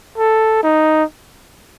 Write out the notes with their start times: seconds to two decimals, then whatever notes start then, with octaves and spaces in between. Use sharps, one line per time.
0.18 A4
0.63 D#4